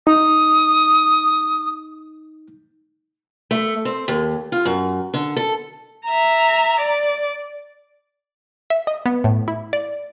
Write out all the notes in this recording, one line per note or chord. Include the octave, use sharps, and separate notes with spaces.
D#4 D#6
A3
C4
D#2
F4
F#2
D3
A4
E5 A#5
D5
E5
D#5
B3
A2
E4
D5